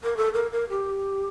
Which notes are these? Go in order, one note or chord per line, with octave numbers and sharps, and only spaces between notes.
A#4
A4
A#4
A#4
G4